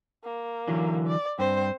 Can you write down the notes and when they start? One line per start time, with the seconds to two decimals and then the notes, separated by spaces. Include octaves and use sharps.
0.24 A#3
0.68 D3 E3 F#3
1.07 D5
1.39 G2 C4 C5